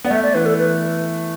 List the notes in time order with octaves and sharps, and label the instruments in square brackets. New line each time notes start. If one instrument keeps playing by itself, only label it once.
[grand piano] B3 [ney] D5
[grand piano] A3 [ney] E5
[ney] D5
[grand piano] E3 [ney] B4
[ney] A4
B4